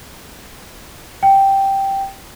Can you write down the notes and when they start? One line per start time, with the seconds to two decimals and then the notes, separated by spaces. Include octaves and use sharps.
1.23 G5